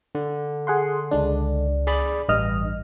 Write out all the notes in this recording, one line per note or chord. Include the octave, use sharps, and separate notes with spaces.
D3
G#4 F#5 C6
C#2 G#3 D4
G#4 D5 B5
A1 G2 D#5 F6